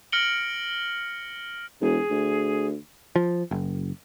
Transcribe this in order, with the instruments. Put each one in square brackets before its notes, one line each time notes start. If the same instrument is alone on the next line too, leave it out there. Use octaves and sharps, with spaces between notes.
[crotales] F6 A#6 C#7 D7 F#7 G7
[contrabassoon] E1 [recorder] G#4
[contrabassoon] D2
[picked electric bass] F3
F#1